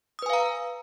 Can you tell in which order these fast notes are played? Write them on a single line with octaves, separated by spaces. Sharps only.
D#6 B4 G#5 F5 A#5